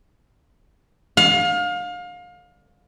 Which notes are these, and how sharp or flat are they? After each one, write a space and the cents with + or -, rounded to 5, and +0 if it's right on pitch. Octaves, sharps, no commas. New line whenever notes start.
F5 +30